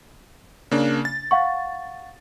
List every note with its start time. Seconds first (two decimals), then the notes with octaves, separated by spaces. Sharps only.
0.71 C#3 A#3 D4
1.05 A6
1.31 F5 F#5 C#6